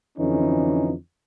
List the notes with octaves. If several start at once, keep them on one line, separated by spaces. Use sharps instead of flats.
F2 D3 E3 C#4 D#4